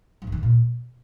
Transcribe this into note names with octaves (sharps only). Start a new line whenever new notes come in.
F3
G2
D#3
C#3
A#2